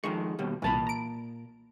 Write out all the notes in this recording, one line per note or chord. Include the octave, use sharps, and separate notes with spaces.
F2 D#3 G#3 C#6
D#2 B2 G3
C2 A#2 E3 A5 B5
A#5 D7